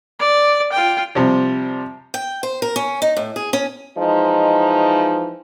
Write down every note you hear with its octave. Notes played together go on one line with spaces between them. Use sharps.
D5
F4 G5
C3 F3 G3
G5
C5
A#4
C#4
D#4
A2
G#4
C#4
E3 F3 G#3 D#4